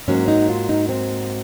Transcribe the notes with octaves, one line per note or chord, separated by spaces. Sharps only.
G#2 F#3 A#3 C#4
D#4
F4
D#4
C4